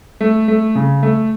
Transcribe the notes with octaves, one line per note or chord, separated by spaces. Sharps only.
A3
A3
C#3
A3